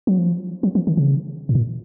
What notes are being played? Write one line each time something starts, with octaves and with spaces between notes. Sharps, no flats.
F#3
F3
F#3
F3
D#3
C#3
A2
A#2